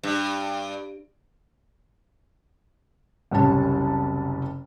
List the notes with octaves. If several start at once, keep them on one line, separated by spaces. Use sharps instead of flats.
G2
F#1 C2 G3 C#4 A5